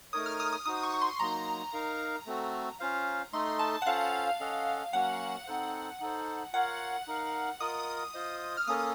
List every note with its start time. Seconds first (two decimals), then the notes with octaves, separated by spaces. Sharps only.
0.13 A3 D#4 A#4 C#5 D#6
0.26 F6
0.40 D#6
0.53 D#6
0.66 D#4 F#4 C5 D#6
0.83 C#6
0.94 C#6
1.01 C6
1.20 F#3 A#3 D#4 A#5
1.73 D#4 A#4 F5
2.26 A3 C4 F#4 A4
2.80 C#4 F4 C5 F5
3.33 A3 D#4 A4 D#5 C6
3.59 A5
3.82 F#5
3.86 C#4 F4 A4 C5 F5
4.40 C#4 A4 D#5 F#5
4.93 F#3 A#3 C#4 F#4 F#5
5.47 C4 D#4 A4 C5
6.00 D#4 A4 C5
6.53 F4 A#4 C#5 F5 F#5
7.07 D#4 A#4 F5
7.60 F4 A#4 D#5 D#6
8.14 F4 C5 D#5
8.57 F6
8.67 A#3 C#4 A4 D#6